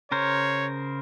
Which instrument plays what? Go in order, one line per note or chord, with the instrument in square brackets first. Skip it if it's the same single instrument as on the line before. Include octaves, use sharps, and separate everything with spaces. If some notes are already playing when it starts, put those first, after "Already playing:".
[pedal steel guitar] C#3 A#4 C5 [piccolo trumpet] C#5